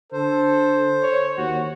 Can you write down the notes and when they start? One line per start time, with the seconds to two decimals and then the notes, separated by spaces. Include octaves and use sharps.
0.13 D3 A4 C5
1.03 C#5
1.37 D#2 F#4